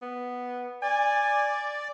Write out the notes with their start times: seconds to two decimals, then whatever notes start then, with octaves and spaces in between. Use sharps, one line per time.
0.02 B3
0.83 D5 G#5